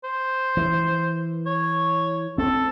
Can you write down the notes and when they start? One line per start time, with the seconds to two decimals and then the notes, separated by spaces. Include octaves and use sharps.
0.04 C5
0.57 E3
1.46 C#5
2.38 C4 A4